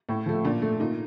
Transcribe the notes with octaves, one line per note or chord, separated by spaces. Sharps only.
A2
F3 A3
A#2 D4
A3
A#2 D#4